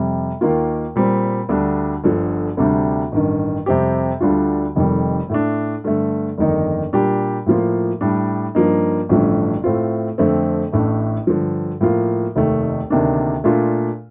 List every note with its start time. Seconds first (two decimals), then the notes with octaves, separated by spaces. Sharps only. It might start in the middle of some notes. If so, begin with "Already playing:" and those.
Already playing: F2 C3 G3
0.41 D#2 D#3 A#3 F4
0.96 A#2 G3 C4
1.49 D2 D3 G3 D4
2.04 G1 G2 D3 F3
2.57 D2 C3 G3 D4
3.12 A1 G2 D#3
3.66 F2 C3 G3 C4 G4
4.21 D2 D3 G3 D4 F4
4.76 F1 F2 D#3 G3
5.30 A2 A3 D4
5.84 G2 D3 A3
6.38 G1 F2 D#3 A#3 D#4
6.93 A#2 G3 D4 G4
7.46 A2 F3 A#3 F4
8.01 A2 G3 D4
8.55 G2 F3 A#3 D#4
9.09 A1 G2 D3 F3 A3
9.64 A2 A3 C4 F4
10.18 F2 D3 A3 C4
10.73 A1 A2 A3 D4
11.27 G2 D3 F3
11.81 A2 F3 A#3 F4
12.36 F1 D#2 D#3 A3
12.90 D2 C3 D#3 A#3 D4
13.44 A#2 A3 D4 F4